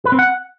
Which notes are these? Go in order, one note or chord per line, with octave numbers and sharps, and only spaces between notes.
B4
C4
F#5